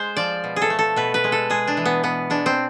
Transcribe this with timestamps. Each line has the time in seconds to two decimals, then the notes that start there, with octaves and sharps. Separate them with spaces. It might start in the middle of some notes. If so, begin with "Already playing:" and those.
Already playing: G#3 C5
0.16 F3 D5
0.44 B2
0.56 G#4
0.62 A4
0.70 A3
0.79 A4
0.96 B2 B4
1.14 B4
1.24 G#3
1.32 A4
1.50 G#3 G#4
1.67 D4
1.77 E3
1.85 B3
2.03 B2 B3
2.30 G#3 D4
2.46 C4